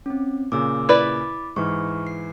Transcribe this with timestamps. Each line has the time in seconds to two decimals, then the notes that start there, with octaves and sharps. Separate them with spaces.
0.06 C4 C#4
0.52 A#2 C#3 D6 E6
0.89 E4 B4 D5 B5 D6 A6
1.56 G#2 E3 C#6 F6
2.07 C7